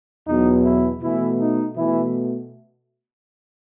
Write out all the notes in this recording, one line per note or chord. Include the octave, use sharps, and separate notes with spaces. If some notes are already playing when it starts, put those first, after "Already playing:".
E2 B2 F#3 D#4
E3 E4
B2 E3 A3 E4
D#4
B2 E3 A3 E4